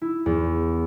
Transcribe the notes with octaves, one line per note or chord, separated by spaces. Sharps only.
E4
E2